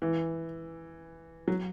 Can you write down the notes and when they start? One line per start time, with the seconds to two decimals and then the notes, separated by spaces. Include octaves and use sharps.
0.02 E3
1.48 F#3